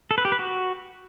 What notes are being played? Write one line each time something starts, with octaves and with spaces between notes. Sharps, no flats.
A4
B4
G4
B4
F#4